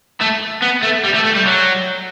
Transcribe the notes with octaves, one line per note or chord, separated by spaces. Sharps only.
A3
B3
A3
G3
A3
A3
G3
F#3